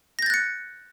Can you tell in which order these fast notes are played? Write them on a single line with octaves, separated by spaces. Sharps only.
A#6 G6 A6 F#6 C#7